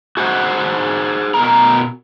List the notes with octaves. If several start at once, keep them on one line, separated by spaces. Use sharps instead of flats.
F#4 G#4 C5 F#5
B2 A#4 A#5